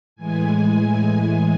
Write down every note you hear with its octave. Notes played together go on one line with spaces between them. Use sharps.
A2 E3 G#3 G#5